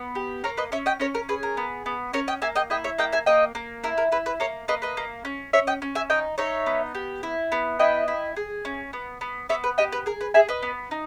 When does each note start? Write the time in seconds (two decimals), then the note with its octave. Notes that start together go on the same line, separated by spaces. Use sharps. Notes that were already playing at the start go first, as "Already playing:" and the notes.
Already playing: B3
0.15 G4
0.44 A#3 A#4 C#5
0.57 B4 D#5
0.72 C#4 C#5 E5
0.86 D#5 G5
1.00 C#4 A#4 C#5
1.15 A#4
1.29 G#4 B4
1.43 A#4
1.57 B3
1.86 B3
2.13 C#4 A#4 C#5
2.28 D#5 G5
2.42 A#3 E5 G#5
2.55 D#5 G5
2.70 E4 D#5 G5
2.84 C#5 E5
2.98 A#3 D#5 G5
3.12 E5 G#5
3.26 A#3 D#5 G5
3.55 A#3
3.84 E4 A#4
3.98 A#4
4.12 E4 B4
4.26 B4
4.40 A#3 A#4 C#5
4.68 A#3 B4 D#5
4.82 B4 D#5
4.97 A#3
5.25 C#4
5.53 C#4 C#5 E5
5.67 D#5 G5
5.82 C#4
5.95 E5 G#5
6.10 D#4 D#5 G5
6.38 D#4 C#5 E5
6.66 B3
6.95 G4
7.23 E4
7.52 B3
7.79 E4 D#5 G5
8.08 E4
8.36 G#4
8.65 C#4
8.93 B3
9.21 B3
9.49 B3 C#5 E5
9.64 B4
9.78 G4 D#5 G5
9.92 B4
10.06 G#4 A#4
10.21 B4
10.34 G#4 E5 G#5
10.49 B4 D#5
10.63 B3
10.91 D#4